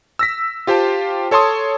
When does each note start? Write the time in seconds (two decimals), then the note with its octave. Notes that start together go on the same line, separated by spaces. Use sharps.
0.19 E6 A#6 B6
0.67 F4 G4 C5 G5 A5
1.31 A4 C#5 A5 C6 D#6